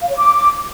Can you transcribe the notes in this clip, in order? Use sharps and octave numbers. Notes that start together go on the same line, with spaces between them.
F5
C#5
D6